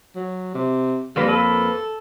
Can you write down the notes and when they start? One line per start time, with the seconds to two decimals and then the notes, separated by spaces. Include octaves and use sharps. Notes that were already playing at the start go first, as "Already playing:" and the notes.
0.15 F#3
0.54 C3
1.16 F2 G3 A#3 B4
1.28 A4